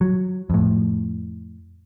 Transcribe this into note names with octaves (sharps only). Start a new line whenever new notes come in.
F#3
F2 A2